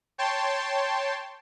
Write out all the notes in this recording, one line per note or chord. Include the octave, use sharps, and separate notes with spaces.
C#5 G5 A5 C6